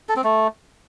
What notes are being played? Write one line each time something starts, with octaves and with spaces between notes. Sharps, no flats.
A4
C4
A3